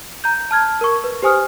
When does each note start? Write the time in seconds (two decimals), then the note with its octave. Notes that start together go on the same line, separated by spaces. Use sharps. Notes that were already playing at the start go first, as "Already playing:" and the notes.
0.24 A#5 G6
0.51 A5 F6 G#6
0.81 A#4 C#6
1.04 B4
1.23 G4 C5 G#5 D#6 F6